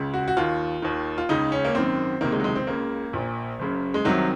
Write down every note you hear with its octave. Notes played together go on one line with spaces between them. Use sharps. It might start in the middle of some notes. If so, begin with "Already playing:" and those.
Already playing: C#2 C#3
F#4
F#4
D#2 D#3 F4
D#2 D#3
F4
C#2 C#3 D#4
C#4
A#3
G#1 F#2 D#3 C4
C#2 C3 D#3 A#3
G#3
F#3
G#3
C4
C#2 C#3 A#3
A#1 A#2
F#1 F#2 C#3
G#3
C2 C3 D#3 F#3